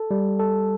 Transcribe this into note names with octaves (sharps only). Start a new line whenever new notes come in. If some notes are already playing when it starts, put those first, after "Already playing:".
Already playing: A4
G3
A4